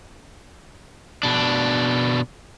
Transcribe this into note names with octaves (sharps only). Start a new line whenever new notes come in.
B2 D4